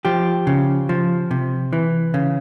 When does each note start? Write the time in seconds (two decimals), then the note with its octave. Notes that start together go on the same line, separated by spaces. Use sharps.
0.05 F3 G4
0.47 C#3
0.89 F3
1.31 C3
1.73 E3
2.14 C#3